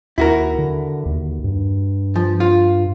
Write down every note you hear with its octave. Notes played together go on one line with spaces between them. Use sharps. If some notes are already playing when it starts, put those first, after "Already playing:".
D#2 E4 F#4 A#4
D3
D#2
G2
F3
F4